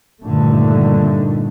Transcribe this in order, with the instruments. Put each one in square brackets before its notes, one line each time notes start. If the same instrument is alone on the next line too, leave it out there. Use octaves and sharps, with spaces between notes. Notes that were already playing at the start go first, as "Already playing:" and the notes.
[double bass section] G2 A#2 D3 D#3 A3